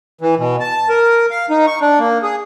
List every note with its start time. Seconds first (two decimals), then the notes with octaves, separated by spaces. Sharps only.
0.21 E3
0.39 B2
0.60 A5
0.89 A#4
1.31 F5
1.50 D#4
1.67 C#6
1.81 D4
1.99 A#3
2.23 G#4